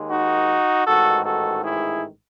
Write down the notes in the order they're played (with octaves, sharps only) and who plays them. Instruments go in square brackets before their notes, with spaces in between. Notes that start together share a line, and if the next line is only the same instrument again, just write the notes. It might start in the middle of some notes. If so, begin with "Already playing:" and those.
Already playing: [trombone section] D#2 D#3 G#3
D#4 F#4
A1 G#2 D#3 F#4 A4
F#4 A4
E4 G#4